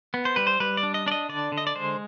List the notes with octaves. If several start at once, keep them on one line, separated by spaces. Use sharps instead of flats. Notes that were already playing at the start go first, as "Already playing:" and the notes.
B3
C5
G3 B4
C5
G3 B4
D5
D4
D#5
D4 D5
D#5
D3 D5
D3
D#5
D5
G#3 C5